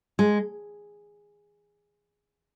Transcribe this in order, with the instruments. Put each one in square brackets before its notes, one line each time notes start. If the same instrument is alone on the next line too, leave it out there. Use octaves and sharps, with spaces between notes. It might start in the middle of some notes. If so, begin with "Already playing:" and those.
[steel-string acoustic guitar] G#3